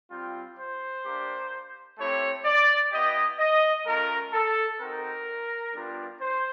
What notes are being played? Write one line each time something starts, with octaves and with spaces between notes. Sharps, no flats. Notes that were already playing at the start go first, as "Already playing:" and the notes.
G3 C4 F4
C5
A#3 D4 G4
A3 C4 E4 G4 C#5
D5
B3 E4 G4 D#5
D#5
A3 C#4 F4 A#4
A4
C4 D#4 F#4 A#4
G3 B3 D4 F4
C5